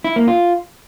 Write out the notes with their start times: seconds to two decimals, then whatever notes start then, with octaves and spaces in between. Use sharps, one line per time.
0.04 E4
0.16 A#3
0.28 F4